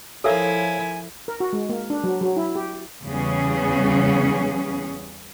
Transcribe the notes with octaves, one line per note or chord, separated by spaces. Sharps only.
F3 E4 A4 A#4 C#5 E5 F5 G#5
A#4
F#4
G#3
A#3
D4
F#3
F#3
E4
G4
E2 C#3 G3 B3 C#4 G#4